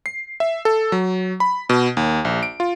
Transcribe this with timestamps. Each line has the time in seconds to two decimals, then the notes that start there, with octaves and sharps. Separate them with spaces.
0.06 C7
0.40 E5
0.65 A4
0.92 F#3
1.40 B5
1.69 B2
1.97 D#2
2.25 A#1
2.43 D7
2.60 F4